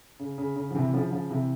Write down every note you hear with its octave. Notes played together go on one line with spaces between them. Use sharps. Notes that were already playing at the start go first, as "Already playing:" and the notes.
C#3
C#3
C#3
F3
C3 E3
C#3 F3
C#3 F3
C3 E3